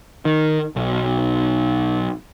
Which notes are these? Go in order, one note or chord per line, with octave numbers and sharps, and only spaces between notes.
D#3
B1